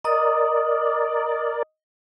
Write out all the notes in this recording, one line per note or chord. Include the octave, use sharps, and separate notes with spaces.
A#4 D5 D#5 D#6